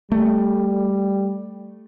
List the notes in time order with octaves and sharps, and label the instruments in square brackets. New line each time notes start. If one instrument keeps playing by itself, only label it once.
[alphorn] G3 [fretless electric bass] A3